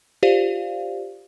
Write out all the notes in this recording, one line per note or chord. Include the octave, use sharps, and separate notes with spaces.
F4 G4 C5 D5 F5